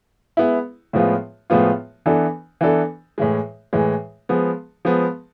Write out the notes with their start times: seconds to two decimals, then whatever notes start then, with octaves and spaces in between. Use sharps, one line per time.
0.37 G#3 B3 E4
0.93 A2 F3 G#3 B3 F4
1.50 A2 F3 G#3 B3 F4
2.06 E3 B3 D4 A4
2.61 E3 B3 D4 A4
3.18 A2 E3 G#3
3.73 A2 E3 G#3
4.29 F3 G#3 B3
4.85 F3 G#3 B3